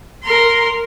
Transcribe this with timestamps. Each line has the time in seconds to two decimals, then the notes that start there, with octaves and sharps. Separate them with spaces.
0.23 A#4 C6